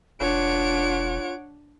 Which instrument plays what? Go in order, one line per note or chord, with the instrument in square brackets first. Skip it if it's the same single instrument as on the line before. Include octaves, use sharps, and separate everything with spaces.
[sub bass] E1 [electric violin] D4 D7 [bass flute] F4 [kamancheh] C#5 F#5